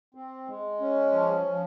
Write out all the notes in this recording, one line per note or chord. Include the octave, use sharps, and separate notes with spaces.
C4
G#3
C#4
F3
F3